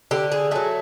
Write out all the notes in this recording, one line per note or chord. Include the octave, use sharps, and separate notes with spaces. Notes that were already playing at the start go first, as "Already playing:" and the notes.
D3 G4
G#4
F#3 A3 G#4